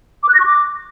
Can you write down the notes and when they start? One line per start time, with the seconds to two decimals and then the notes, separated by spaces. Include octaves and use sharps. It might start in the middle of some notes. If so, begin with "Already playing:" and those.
0.23 D6
0.29 F#6
0.34 A#6
0.40 C#6
0.46 D6